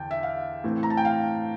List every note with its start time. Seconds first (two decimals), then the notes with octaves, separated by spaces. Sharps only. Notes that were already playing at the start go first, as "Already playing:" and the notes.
Already playing: E2 D3 G5 A5
0.11 E5
0.23 F5
0.64 A2 E3 A3 C4
0.83 A#5
0.90 A5
0.97 G5
1.05 F5